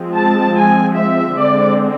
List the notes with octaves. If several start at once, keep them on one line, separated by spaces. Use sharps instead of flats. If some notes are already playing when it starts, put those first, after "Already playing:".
Already playing: F3 G#3 C4
A5
G#5
E5
D3 G#3 C4 D5